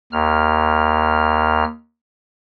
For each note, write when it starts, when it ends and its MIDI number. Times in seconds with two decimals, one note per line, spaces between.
0.12 1.64 39
0.12 1.64 89